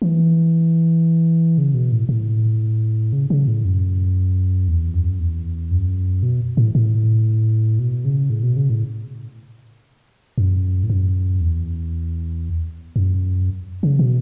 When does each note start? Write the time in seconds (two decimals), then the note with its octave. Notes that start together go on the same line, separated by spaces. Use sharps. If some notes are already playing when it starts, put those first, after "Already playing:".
0.02 E3
1.58 C#3
1.74 B2
1.92 A2
2.09 A2
3.13 C#3
3.30 C#3
3.48 A2
3.65 F#2
4.68 E2
4.94 F#2
5.20 E2
5.71 F#2
6.23 B2
6.57 A2
6.75 A2
7.79 B2
8.05 C#3
8.30 A2
8.43 B2
8.56 C#3
8.70 A2
10.38 F#2
10.83 A2
10.90 F#2
11.41 E2
12.96 F#2
13.83 C#3
13.99 B2